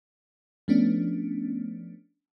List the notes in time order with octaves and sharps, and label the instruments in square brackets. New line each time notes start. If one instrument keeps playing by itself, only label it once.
[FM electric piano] F3 A3 B3 C#4 D4